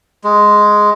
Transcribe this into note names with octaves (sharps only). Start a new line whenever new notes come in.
G#3